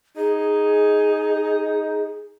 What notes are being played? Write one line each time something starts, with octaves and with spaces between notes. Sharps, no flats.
D#4 G#4